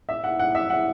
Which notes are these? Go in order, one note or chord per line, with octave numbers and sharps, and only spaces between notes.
E5
F#5
F#5
E5
F#5